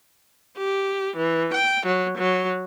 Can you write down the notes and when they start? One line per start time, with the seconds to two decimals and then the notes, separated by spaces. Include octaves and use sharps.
0.57 G4
1.16 E3
1.53 G5
1.85 F#3
2.17 F#3